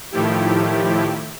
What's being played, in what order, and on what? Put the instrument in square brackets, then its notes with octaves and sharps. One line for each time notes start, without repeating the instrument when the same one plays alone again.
[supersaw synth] A2 D#3 F3 A3 E4 G4